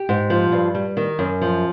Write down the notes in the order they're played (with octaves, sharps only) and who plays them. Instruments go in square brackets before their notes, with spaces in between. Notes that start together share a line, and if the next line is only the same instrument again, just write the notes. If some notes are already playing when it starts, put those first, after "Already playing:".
Already playing: [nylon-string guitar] G4
G#2
F3
G2
G3
D#3
F#2
F3